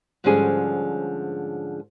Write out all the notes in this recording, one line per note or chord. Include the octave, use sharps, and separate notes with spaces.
G#2 D3 F3 G3 C#4 G#4